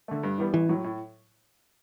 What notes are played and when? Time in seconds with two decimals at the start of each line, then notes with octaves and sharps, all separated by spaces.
0.08 D3 A3
0.23 G2
0.38 E3 G3 B3
0.54 A1 E3
0.69 A2 F#3
0.84 A2